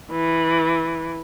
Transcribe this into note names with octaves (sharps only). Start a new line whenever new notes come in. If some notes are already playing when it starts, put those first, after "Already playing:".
E3